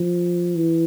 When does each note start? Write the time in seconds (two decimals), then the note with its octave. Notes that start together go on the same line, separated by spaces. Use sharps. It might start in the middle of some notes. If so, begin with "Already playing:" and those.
Already playing: F3
0.56 E3